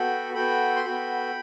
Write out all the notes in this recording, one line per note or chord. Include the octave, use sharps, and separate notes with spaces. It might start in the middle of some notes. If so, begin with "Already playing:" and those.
Already playing: B3 F#4 A4 G5 B5
B3 F#4 A4 G5 B5
C6
B3 F#4 A4 G5 B5